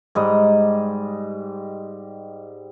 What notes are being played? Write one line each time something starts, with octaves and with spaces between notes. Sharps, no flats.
G#2 G3 D#5